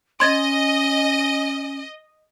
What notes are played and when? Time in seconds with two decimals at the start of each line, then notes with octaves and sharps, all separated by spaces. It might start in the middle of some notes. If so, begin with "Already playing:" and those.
0.20 C#4 D#5 C6 G#6 A6